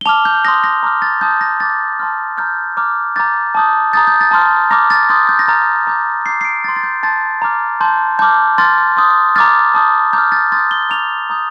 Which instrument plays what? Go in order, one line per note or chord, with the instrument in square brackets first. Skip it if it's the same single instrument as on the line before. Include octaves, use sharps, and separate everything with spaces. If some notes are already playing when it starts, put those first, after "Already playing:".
[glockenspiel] G7
A5 D6 F6 F7
G6
C6 D#6 G6 A#6
A#6
A#5 D6 F6
A6
A5 D#6 G6
A#6
A5 D6 F6 A6
A5 C6 F6
A#5 F6 G6
A#5 D6 F6
A#5 D6 G6 A6
A5 D#6 G6
A#5 D#6 G6 A6
G6
A6
A5 C6 F6
A#5 D6 F6 A#6
A6
C6 D#6 G6 A6
G6
A#6
A#5 F6 A6
A#5 D6 G6
A#5 D6 G6 C7
C7
D7
C6 G6 A6
A6
G6
A5 C6 G6 A6
A#5 D6 F6
A5 C6 G6
A5 D6 F6 G6
C6 F6 A6
C6 D#6 G6
A#5 D6 F6 A6
A5 D#6 G6
A#5 D6 F6 G6
A6
C6 D#6 G6 A6
G7
A#5 D6 F6 F7
A#5 D#6 G6